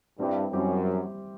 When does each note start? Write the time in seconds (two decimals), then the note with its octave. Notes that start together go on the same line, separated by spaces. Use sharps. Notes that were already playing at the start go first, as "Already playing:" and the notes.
0.19 G2 G3 C4 E4 G4
0.53 F#2 G3 C4 E4 G4